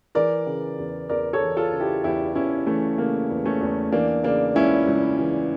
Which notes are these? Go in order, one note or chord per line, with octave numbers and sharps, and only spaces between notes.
E3 A#4 D5
C#3
E2
E2 A#4 D5
A4 C#5
E3
F4 A4
C#3
E4 G4
E2 E4 G4
E2 C#4 E4
E3 A3 C#4
C#3 A#3
E2
A3 C#4
E2
E3 A#3 D4
C#3 A#3 D4
C#2 C#4 E4
C#2
E3